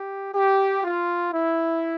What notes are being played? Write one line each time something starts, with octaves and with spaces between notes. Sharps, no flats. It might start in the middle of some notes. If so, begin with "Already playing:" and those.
Already playing: G4
G4
F4
E4